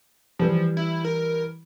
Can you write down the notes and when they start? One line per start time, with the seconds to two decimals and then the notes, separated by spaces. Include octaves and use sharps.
0.39 E3 F3 G3
0.77 E4
1.04 A#4